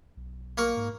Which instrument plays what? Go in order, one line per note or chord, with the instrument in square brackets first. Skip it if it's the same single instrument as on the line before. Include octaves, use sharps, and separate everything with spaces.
[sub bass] B1
[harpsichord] A#3 A#4 C#6
[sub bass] G#2